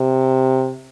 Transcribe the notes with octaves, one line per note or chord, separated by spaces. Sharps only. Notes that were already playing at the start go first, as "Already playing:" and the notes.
Already playing: C3